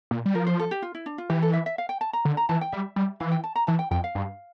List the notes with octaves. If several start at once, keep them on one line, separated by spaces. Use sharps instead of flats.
A#2
G3
F3 A#4
C5
A4
G4
F4
E4
D4
F4
E3 G4
A4
E5
E5
F5
G5
A5
A#5
D3
A#5
E3 A5
G5
G3 E5
G3
E3 F5
G5
A5
A#5
E3 A5
G5
F2 G5
F5
G2